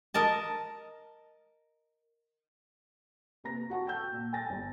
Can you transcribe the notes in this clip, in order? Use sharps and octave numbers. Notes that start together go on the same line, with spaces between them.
A#4 D#5 A5
C3 A#3 B4 A#5 A#6
F#4 F#5 A5 C#6
G5 A5 E6 G6
A#2
G#5 A5 A6 A#6
G1 G#5